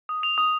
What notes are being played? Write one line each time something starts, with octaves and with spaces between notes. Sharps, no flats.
D#6
F7
D#6